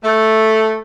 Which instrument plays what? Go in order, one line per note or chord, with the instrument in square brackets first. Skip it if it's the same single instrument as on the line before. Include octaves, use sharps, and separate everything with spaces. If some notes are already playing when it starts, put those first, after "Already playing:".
[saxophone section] A3